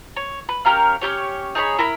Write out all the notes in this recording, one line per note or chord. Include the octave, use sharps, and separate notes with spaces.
C#5
B4
C#4 G4 A#4 F5
C#4 E4 G4 C#5
D#4 G#4 C#5 B5
E4 A#4 B5